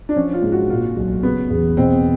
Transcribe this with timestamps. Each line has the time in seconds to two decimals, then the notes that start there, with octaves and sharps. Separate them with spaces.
0.09 D4
0.16 F3 C#4
0.33 F4
0.43 G#2
0.52 F#4
0.69 A#2 F4
0.96 B1
1.23 C#3 B3
1.50 E2
1.77 B2 C4